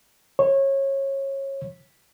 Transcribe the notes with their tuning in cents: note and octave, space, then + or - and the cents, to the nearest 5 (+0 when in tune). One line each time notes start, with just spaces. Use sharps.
C#5 -25